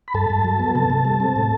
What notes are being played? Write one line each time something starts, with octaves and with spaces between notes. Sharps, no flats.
B5
G2 A4 A5
G2
F#3
B3
C3 A4 A5
C3
G3
C4
A2